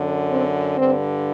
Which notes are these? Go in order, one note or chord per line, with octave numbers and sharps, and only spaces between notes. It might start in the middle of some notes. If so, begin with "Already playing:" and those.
Already playing: F#2 D3
C4
G2 D3 C4